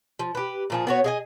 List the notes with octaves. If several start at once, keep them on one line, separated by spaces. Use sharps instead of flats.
F3
G4 B4
A#2 F3 G#4
B3 F#4 C#5
G#4 D#5 G#5